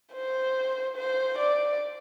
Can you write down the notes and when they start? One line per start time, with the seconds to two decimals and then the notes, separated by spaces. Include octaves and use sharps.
0.13 C5
0.97 C5
1.38 D5